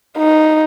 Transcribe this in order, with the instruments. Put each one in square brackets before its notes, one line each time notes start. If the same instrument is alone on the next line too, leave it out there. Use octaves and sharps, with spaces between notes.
[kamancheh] D#4